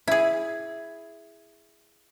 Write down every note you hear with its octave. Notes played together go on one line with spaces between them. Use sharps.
E4 G#4